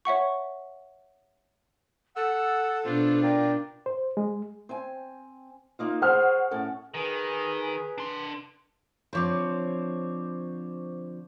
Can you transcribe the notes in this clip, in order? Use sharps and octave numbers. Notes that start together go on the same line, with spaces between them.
C#5 E5 F#5 C#6
A4 F#5 E6
B2 D4 F4 C5
A#4 D5 G5
C5
G#3
C4 G#5
A#3 D#4 F4
G#4 C5 C#5 F#5 F6
A2 C#4 A4
D#3 G#4 B4
D4 C6
D3 F3 C4 C5 C#5 D6